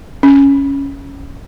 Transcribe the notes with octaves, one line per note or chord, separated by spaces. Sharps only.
C#4